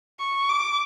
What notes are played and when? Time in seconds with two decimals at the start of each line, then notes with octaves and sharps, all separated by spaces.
0.19 C#6
0.49 D6